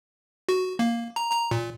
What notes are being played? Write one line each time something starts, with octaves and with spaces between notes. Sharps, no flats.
F#4
A#3
A#5
A#5
A#2